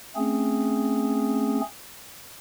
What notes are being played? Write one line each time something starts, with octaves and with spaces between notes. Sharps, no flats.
A3 C4 C#4 G#4